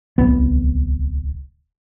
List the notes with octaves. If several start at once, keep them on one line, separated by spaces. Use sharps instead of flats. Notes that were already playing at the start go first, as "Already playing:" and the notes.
D1 C2 B3